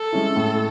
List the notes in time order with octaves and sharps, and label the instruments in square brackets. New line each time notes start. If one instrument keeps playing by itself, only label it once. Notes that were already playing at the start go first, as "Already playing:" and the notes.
Already playing: [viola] A4
[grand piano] G#3 C#4 E4
A2